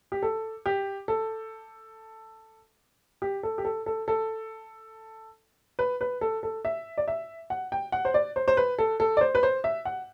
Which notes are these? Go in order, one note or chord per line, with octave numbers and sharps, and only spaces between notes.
G4
A4
G4
A4
G4
A4
G4
A4
A4
A4
B4
B4
A4
A4
E5
D5
E5
F#5
G5
F#5
C5
D5
C5
C5
B4
A4
A4
D5
C5
B4
C5
E5
F#5